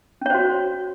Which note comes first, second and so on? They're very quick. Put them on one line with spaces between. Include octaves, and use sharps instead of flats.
C#4 C#5 C5 F#4